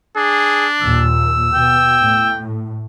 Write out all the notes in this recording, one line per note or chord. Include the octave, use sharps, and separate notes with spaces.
D4 G#4
D#2 A#2 E6
B2 G5
A2